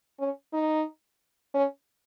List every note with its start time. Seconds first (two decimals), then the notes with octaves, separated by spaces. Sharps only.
0.19 C#4
0.53 D#4
1.54 C#4